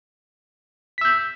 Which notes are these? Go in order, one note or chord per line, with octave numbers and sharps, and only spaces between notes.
E6 G6 B6